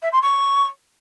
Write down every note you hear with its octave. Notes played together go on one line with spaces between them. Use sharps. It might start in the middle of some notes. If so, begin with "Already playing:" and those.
E5
C6
C#6